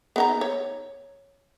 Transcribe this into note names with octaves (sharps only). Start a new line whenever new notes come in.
B3 D#4 A#5
C#5